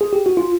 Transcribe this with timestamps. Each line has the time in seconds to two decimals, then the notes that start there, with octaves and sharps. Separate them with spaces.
0.01 G#4
0.13 G4
0.26 F#4
0.37 F4